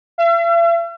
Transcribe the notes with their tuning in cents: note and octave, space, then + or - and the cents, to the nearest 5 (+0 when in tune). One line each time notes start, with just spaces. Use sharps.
E5 +45